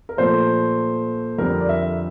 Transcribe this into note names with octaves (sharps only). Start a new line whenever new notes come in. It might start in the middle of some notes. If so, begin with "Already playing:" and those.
A#4
A#2 F3 A3 C5
F2 D3 G3 C4 A#4
D5
E5